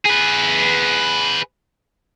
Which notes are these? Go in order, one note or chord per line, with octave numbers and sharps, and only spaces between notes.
G#4 B4